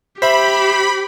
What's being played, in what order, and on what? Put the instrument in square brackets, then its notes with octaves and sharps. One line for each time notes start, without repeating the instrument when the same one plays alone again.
[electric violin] G4 [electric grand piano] C5 E5 [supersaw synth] B5